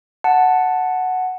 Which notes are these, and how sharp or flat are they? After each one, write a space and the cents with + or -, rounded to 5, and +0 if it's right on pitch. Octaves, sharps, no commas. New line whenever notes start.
F#5 +0 A5 +0